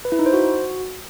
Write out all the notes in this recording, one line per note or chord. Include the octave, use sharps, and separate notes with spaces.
B4
E4
D#4
C5
F#4